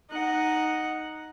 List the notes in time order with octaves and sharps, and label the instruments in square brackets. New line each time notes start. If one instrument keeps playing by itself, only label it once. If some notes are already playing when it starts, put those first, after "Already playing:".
[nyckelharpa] D#4 F#5